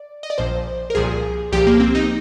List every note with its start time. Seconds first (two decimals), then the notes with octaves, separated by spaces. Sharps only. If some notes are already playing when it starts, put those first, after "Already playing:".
Already playing: D5
0.23 D#5
0.30 D5
0.38 A#1 A#2 F3 C5
0.90 A#4
0.95 C2 A#2 F3 G#4
1.52 C2 A#2 F3 G4
1.67 A#3
1.80 C4
1.95 D#4